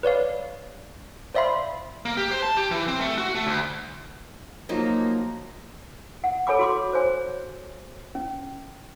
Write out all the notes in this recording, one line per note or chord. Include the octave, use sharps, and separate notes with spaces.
B4 C#5 D5 F5
C5 D5 E5 F5 B5 C6
A#3
G4
C5
A5
G4
E3
C4
A3
F#4
A3
D2
F3 F#3 A#3 D#4
F#5
A4 C#5 G#5 B5 D6
F#4 C6 D6
C5 C#5 G#5
C#4